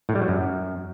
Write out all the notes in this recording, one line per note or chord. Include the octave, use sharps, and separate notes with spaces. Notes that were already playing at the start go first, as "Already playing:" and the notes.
A2
G3
F#3
F#2